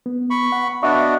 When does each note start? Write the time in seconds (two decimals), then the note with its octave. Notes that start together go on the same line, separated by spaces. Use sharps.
0.06 B3
0.30 B5 C#6
0.52 F#5
0.83 B3 D4 F#4 D#5 E5 C#6